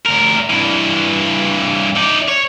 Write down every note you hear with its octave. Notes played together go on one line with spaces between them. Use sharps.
D2 A#4
G2 E3
D#4 D5
C#5